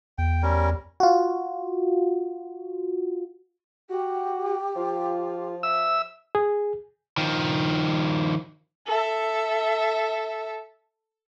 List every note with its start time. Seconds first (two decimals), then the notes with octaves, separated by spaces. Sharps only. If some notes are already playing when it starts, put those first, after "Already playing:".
0.18 E2 G5
0.43 G3 C#4 A#4
1.00 F4 F#4
3.89 F#4 G4
4.76 F3 F4
5.63 E5 E6
6.35 G#4
7.18 D#3 F3
8.88 A4 E5